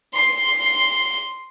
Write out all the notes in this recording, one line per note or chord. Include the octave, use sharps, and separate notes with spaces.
C6 C7